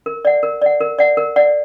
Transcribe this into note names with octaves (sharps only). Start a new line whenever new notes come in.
A#4
D5 F#5
A#4
D5 F#5
A#4
D5 F#5
A#4
D5 F#5